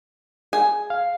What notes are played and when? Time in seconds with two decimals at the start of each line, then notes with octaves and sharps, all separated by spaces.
0.53 G#4
0.90 F5